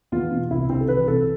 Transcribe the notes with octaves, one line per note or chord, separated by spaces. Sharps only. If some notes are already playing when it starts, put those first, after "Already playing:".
E2 F4
B2
C2 E4
C3 C4
A4
E3 B4
C2 A4